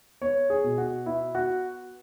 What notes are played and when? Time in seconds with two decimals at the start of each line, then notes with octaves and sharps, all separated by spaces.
0.21 B3 C#5
0.50 G#4
0.64 B2
0.78 F#4
1.06 B3 E4
1.35 F#4